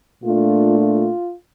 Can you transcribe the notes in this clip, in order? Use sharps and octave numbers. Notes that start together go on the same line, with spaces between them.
A#2 A3 D4 F4
F4